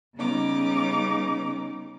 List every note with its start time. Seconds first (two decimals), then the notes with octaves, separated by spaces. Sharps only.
0.16 C#3 G3 B3 C#4 D#4 D6